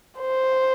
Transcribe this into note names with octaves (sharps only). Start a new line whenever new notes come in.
C5